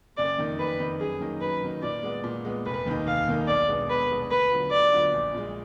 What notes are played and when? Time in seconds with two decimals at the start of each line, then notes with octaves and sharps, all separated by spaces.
0.17 F#1 D5
0.38 F2 D#3 A#3 D#4
0.59 F#1 B4
0.79 F2 D#3 A#3 D#4
1.00 F#2 G#4
1.21 D#3 F#3 A#3 D#4
1.41 F#2 B4
1.63 D#3 F#3 A#3 D#4
1.82 A#2 D5
2.03 G#3 B3
2.24 A#2
2.45 G#3 B3
2.66 F1 B4
2.86 D#2 D#3 A#3 D#4
3.07 F1 F5
3.28 D#2 D#3 A#3 D#4
3.48 B1 D5
3.68 B2 G#3 B3 D4
3.89 B1 B4
4.10 B2 G#3 B3 D4
4.31 D2 B4
4.51 D3 F#3 B3 F4
4.71 D2 D5
4.92 D3 F#3 B3 F4
5.14 A#1
5.34 A#2 G#3